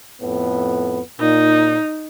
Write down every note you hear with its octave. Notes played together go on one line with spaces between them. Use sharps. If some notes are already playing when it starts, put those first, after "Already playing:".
F2 A2 B3
A#2 D#4